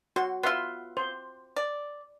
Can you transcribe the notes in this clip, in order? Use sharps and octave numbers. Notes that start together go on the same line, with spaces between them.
F#4 C6
B3 F4 E5 C6
C5
D5